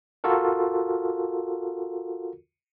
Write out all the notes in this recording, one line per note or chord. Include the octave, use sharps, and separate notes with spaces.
F4 F#4 A4 A#4